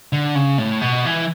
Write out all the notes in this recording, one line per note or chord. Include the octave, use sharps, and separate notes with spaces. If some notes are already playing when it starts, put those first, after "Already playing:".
D3
C#3
A2
B2
E3